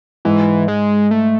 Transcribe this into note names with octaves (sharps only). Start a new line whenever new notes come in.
G#2 E3
G#3
A3